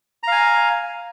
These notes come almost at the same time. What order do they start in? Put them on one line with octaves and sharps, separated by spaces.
A#5 F5 G#5